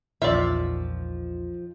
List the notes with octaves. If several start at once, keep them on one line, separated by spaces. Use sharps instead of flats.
A#1 E2 D#3 F3 F4 D5 E5